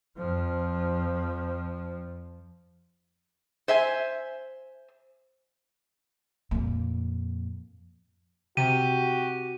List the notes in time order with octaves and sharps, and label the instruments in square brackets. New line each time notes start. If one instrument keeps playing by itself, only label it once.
[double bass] F2 F3
[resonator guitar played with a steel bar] C5 E5 G#5
[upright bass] F2 A#2
[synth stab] C3 [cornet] F#4 [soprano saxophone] G4 [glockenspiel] D#7